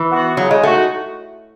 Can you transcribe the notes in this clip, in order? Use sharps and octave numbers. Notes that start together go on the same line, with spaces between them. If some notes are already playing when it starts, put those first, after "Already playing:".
Already playing: E3
B3 F#4
C#3 F#3
G#3
G#3 A3 D#4 F#4